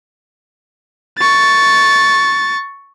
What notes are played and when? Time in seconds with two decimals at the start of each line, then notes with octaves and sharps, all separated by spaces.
1.19 C#6 A6